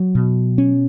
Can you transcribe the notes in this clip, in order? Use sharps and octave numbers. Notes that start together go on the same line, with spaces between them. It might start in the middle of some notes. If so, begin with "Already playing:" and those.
Already playing: F#3
B2
C#4